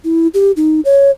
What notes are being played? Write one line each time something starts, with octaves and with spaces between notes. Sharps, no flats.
E4
G4
D#4
C#5